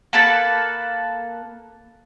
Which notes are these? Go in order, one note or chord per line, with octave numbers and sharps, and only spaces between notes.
A#3 A4 B4 A5